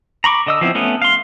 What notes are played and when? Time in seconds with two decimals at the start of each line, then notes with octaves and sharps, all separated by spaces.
0.24 A#5 B5 C#6 D6
0.47 D3 D#5 E6
0.61 F3 B3 C4 E4
0.75 A3 B3 C#4
1.02 F5 C6